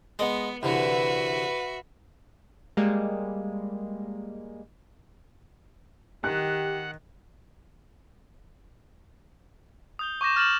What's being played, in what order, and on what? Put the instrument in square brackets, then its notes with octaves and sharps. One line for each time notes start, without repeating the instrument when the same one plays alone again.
[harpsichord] G#3 D#5 [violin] B3
[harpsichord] C2 D3 E3 [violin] F#4 E5 [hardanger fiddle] B4
[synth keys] G3 G#3 A#3
[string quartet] D#3 [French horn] G4 [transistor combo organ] F#5 [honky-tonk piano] F#6
[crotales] D#6 G6 G7
C#6 D6 G6 A#6 E7
F6 A6 E7 F#7